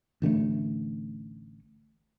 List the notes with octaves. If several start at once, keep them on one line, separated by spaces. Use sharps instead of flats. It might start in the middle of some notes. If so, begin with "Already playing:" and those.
A1 D3 G#3 A3